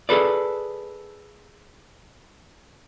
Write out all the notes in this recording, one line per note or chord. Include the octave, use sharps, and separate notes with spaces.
G#4 A4 B4 D5